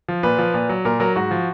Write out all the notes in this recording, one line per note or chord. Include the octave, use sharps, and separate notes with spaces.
F3
A#2 B4
F3
A#2
F#3
A#2 A#4
F#3 A#4
G#2 F#4
F3